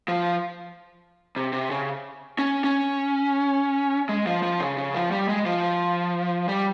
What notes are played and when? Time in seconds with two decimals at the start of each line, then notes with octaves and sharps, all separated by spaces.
0.08 F3
1.36 C3
1.53 C3
1.71 C#3
2.39 C#4
2.64 C#4
4.09 G#3
4.26 F3
4.43 F3
4.60 C#3
4.78 C#3
4.95 F3
5.11 G3
5.29 G#3
5.46 F3
6.48 G3